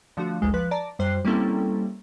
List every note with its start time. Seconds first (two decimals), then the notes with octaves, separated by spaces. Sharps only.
0.17 D3 F3 A3 D4 F#4
0.42 G#1 D2 G#3
0.54 F3 B4 F#6
0.71 D5 A5 A#5
0.99 F#2 G3 C5 F#6 C7
1.25 G3 A#3 C4 C#4 E4 A4